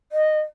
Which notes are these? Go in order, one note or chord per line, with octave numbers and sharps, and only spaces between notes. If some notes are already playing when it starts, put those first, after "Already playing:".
D#5